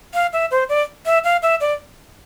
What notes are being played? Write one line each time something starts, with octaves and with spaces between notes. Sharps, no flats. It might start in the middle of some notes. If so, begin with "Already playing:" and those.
F5
E5
C5
D5
E5
F5
E5
D5